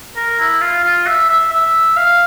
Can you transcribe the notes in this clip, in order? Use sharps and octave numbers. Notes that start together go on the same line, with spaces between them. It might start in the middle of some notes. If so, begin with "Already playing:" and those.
A#4
E4
F4
F4
E5
E5
E5
F5